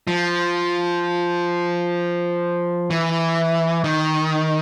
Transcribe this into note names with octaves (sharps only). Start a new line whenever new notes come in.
F3
E3
D#3